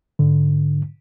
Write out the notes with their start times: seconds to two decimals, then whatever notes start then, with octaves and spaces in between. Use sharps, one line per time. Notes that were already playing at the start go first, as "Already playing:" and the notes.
0.19 G#2 D3